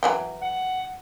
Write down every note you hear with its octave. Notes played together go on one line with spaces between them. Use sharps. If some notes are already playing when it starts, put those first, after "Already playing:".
E3 F#3 G5
F#5